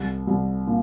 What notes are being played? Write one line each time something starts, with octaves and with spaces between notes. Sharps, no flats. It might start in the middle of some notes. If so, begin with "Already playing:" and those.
Already playing: C2
C2
A#2